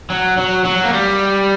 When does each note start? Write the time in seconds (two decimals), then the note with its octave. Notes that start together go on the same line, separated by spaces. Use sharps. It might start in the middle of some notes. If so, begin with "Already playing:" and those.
0.10 F#3
0.38 F#3
0.65 F#3
0.84 A#3
0.93 G3